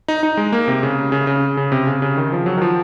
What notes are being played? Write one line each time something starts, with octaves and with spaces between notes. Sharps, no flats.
D#4
D#4
G#3
A#3
C3
C#3
C#3
C#3
C#3
C3
C#3
C#3
D#3
F3
F#3
D#3
F3